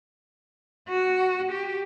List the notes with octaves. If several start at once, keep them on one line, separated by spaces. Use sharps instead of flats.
F#4
G4